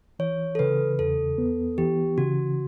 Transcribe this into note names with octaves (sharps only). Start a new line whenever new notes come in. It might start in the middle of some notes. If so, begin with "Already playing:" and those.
E3 C#5
A4
C#3 B4
E2 A4
B3
E3 G4
C#3 F#4